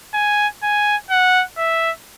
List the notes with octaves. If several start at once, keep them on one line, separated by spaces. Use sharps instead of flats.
G#5
G#5
F#5
E5